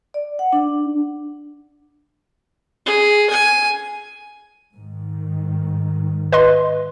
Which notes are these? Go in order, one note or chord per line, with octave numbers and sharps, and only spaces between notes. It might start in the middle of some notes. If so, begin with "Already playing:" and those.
D5
F#5
D4
G#4
G#5
G#2 D#3
B4 D#5 C6